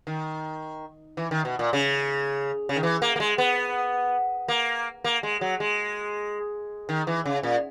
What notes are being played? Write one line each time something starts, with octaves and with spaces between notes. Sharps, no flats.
D#3
E3
D#3
B2
A#2
C#3
C#3
D#3
E3
A#3
A#3
G#3
B3
A#3
A#3
G#3
F#3
G#3
D#3
E3
C#3
A#2